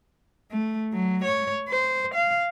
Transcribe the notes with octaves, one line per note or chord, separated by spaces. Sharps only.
A3
F#3
C#5
C5
F5